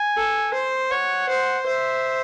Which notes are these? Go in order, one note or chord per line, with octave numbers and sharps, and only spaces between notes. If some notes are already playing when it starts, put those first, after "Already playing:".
Already playing: G#5
A4
C5
C#5 F#5
C5
C5 E5